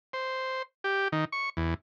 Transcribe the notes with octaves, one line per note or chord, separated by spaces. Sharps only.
C5
G4
D#3
C#6
E2